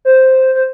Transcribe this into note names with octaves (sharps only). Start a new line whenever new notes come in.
C5
C5